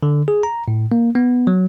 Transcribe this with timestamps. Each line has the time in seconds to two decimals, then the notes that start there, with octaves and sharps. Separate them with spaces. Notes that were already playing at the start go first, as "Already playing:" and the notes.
0.03 D3
0.28 G#4
0.43 A#5
0.68 A2
0.92 A#3
1.15 B3
1.47 F#3